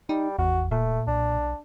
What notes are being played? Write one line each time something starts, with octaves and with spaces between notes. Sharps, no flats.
G3 D#4
G#1 E2 F#4
D1 A#2 A3
B1 D4